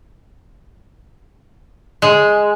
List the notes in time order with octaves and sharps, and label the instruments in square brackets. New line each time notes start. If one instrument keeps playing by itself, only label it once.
[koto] G#3